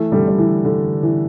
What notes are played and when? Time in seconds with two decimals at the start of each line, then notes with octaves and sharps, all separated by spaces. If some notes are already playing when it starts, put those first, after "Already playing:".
Already playing: E3 A3
0.12 D3 G3
0.28 G3
0.38 E3
0.65 D3
1.03 E3